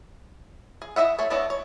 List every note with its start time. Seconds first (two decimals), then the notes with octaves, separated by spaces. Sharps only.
0.82 G#4
0.96 E4 D#5 E5 F#5
1.19 A3 C5 C#5
1.30 B3 D4 E4 C#5 D#5
1.50 C#5